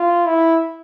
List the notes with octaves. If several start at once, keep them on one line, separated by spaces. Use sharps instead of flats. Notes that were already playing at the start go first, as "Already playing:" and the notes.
Already playing: F4
E4